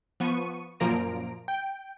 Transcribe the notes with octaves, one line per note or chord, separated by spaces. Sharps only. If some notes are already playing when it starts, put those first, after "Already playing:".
F3 B3 C#6 D#7
F#2 A#2 F3 A#3 A#5 D7
G5